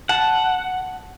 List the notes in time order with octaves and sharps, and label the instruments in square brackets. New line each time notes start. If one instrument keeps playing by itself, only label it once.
[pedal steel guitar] F#5 [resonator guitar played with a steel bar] A5